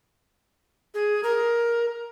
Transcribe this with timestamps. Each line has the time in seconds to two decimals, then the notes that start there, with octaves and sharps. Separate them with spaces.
0.94 G#4
1.23 A#4